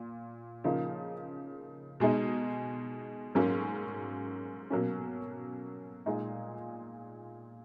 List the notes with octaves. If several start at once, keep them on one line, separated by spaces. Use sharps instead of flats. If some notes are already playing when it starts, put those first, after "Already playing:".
Already playing: A#2
C#3 F3 A#3 D#4
B2 G#3 D#4
G#2 F#3 A#3 C#4
B2 F#3 A#3 C#4
A#2 G#3 D#4